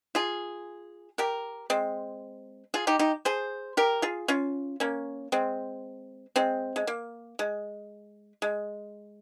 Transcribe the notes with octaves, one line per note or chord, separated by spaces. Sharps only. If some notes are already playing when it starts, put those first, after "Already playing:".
F4 G#4
G4 A#4
G#3 C4
F4 G#4
D#4 G4
D#4 G4
G#4 C5
G4 A#4
F4 G#4
C#4 F4
A#3 C#4
G#3 C4
G#3 C4
G#3
A#3
G#3
G#3